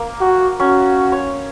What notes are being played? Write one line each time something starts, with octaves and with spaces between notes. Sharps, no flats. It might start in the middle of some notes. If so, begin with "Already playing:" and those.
Already playing: A#3
F#4
C#4 F#4
C#5